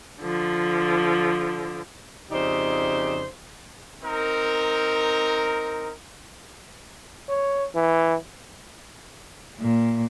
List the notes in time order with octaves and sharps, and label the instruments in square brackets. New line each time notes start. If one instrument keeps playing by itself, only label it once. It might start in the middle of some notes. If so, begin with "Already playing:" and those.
[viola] D3 F3
[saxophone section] F2 C#3 D#4 G4 C5 D5
[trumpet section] C4 D#4 A#4
[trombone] C#5
E3
[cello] A#2